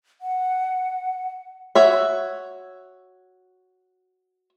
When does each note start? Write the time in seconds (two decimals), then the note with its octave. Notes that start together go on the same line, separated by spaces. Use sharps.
0.21 F#5
1.75 F#4 C#5 E5